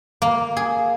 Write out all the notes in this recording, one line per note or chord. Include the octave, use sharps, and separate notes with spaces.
A#3
G#4